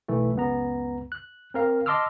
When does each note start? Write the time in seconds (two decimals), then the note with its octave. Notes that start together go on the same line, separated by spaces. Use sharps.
0.08 B1 E3 A3
0.35 C#2 F#2 B3 A#5
1.12 F#6
1.54 C4 A#4 F5
1.86 D#5 A5 C6 D6 E6 F6